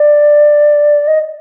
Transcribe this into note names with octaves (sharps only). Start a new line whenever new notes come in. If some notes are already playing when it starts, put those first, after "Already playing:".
Already playing: D5
D#5